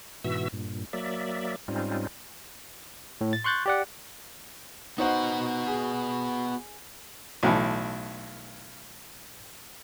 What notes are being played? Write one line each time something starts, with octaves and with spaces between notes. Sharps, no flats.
G#2 B2 E3 F#4 E5 E6
G2 A#2
F#3 A#3 D5 E5
G#2 G3 C4 C#4 D#4 F4
A2
A6
C6 C#6 F#6 G6 A6
G4 D5 F#5
B3 D#4 F#4 C5 F#5
G#4
B1 A2 E3